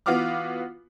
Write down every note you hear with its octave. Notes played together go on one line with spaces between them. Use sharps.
E3 B3 F4 F#4 D6 F6